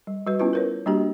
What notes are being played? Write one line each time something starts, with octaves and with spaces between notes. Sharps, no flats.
G3
G3 F#4 B4
B3 C#4 E4 F4 B4
A#4 B4 C#5
G3 A#3 D4 F#4 G4